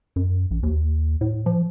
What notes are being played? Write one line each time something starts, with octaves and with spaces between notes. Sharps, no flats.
F#2
A#1
D#2
A2
F3